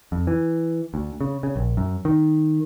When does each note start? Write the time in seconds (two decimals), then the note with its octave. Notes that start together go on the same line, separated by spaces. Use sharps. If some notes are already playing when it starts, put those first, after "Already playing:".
0.12 F2
0.27 E3
0.94 D2
1.21 C#3
1.43 C#3
1.56 A#1
1.77 F#2
2.05 D#3